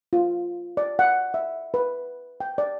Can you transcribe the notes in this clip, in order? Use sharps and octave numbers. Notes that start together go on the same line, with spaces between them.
F4
D5
F#5
E5
B4
G5
D5